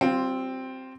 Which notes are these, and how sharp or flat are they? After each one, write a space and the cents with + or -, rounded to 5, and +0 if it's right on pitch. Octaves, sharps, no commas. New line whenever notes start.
G3 -35 C4 +0 F4 +5